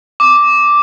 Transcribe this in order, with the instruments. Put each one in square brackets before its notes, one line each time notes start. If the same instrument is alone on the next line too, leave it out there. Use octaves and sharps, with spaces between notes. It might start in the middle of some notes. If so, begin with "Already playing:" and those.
[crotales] D6